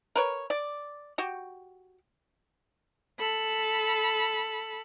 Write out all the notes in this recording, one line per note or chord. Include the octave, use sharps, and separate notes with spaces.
A#4 B4 C#5
D5
F#4 G4
A4 B5